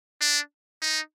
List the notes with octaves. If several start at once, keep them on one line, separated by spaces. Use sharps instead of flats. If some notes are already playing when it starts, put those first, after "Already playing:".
D4
D#4